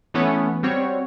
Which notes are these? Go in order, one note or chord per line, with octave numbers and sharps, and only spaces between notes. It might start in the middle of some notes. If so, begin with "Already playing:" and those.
E3 A3 B3 C#4
G3 C4 F#4 C#5